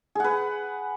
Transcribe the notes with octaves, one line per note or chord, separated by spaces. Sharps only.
G#4 B4 F#5